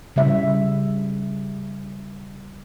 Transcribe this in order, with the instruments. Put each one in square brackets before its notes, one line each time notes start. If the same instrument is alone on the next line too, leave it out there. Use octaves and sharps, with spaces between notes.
[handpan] C#3 G3 E5